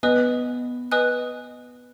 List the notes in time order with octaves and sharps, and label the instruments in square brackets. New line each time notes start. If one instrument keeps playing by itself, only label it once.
[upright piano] B3 [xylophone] B4 D#5 G#5 D#6 F#6
[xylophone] B4 D#5 G#5 D#6 F#6